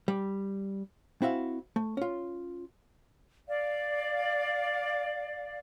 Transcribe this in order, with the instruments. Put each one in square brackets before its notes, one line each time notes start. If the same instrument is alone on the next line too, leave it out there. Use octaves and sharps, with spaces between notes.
[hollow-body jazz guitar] G3
C4 E4 F#4 E5 F5
A3
C#4 F4
[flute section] D5 F5